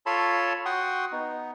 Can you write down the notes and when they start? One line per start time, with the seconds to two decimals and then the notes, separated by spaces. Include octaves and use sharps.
0.06 F4 A4 C#5 A5 B5 C6
0.65 F#4 F#5 G5 C6 C#6 D#6
1.12 B3 D#4